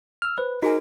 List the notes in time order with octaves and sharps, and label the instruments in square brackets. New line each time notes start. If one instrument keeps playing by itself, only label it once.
[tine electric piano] E6 F6
[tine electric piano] B4 [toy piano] C5
[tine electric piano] D#4 [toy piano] F#4 G#4 G#5 [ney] A#4